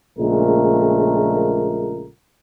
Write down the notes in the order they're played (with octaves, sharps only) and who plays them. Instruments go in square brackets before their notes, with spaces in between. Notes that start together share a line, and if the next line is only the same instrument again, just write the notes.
[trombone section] A#1 A#2 C#3 G#3 A3 A#4